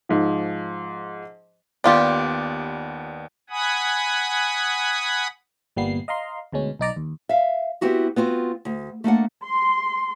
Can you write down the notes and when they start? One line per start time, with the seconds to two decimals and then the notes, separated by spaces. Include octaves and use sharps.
0.09 G#2 F3
1.84 D#2 B3 D4 F4 G4 D5
3.50 F#5 G#5 B5 D#6
5.77 G1 A#2 G3 A#3 B3 C7
6.08 D#5 F5 A#5 C6
6.53 D2 B2 G#3 C#4
6.79 B1 D#4 D5 A#5
6.96 D#2
7.29 E5 F5
7.81 B3 C4 E4 F#4 G4
8.16 B3 C4 F4 F#4
8.65 D2
9.04 A3 A#3 D4 F#5
9.44 C6